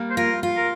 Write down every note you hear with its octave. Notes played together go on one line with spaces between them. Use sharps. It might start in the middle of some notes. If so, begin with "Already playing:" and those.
Already playing: G3 A#3
C5
F4 A#4
F4
A#4